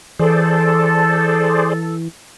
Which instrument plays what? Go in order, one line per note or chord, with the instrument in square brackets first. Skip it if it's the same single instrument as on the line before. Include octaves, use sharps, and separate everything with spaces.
[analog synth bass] E3 [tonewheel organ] G#4 C5 D5 [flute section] A4